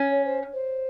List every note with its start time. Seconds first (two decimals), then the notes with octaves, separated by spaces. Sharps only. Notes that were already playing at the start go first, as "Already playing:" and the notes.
Already playing: C#4
0.11 C#5
0.25 C5
0.53 C5